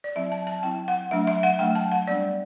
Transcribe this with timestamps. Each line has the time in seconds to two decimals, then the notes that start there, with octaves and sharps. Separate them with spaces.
0.04 D5
0.15 F#3 C4 E4 E5
0.32 A5
0.47 A5
0.63 F#3 C4 E4 G5
0.88 F#5
1.11 F#3 A3 D4 E5
1.27 E5
1.43 F#5
1.59 F#3 A3 D4 G5
1.75 A5
1.92 F#5
2.07 G3 B3 D4 D5